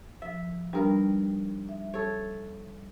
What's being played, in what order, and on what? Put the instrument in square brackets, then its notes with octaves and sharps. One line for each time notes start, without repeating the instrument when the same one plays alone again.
[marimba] F3 [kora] E5
[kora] G2 A#4 [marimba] G3 D#4
[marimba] E5
[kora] A4 C#5